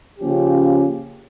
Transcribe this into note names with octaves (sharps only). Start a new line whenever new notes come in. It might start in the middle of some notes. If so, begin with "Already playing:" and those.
C#3 F3 A#3 C#4 G4